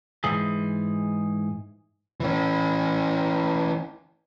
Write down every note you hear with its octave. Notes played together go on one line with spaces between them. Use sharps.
G#2 E3 G#4
E3 C#4